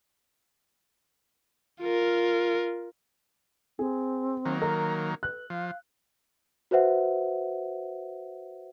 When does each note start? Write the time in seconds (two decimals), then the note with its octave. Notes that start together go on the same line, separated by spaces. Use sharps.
1.81 F4 A#4
3.79 C4 G#4
4.45 D#3 F#3 A#3
4.62 A#4 A#5
5.23 B4 F#6
5.50 F3 F5
6.71 F#4 B4 C5 E5 F#5